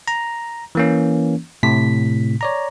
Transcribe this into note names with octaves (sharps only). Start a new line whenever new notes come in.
A#5
E3 A#3 C#4
A2 C3 B6
C#5 D5 A#5